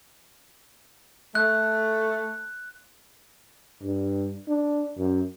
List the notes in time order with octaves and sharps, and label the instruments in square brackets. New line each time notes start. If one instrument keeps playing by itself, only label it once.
[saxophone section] A3 [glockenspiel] F#6
[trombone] G2
D4
F#2